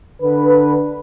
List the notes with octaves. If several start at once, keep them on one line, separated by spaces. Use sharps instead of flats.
D3 B4